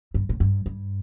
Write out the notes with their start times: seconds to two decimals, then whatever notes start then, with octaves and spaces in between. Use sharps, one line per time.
0.14 G2
0.29 A2
0.40 G2
0.66 G2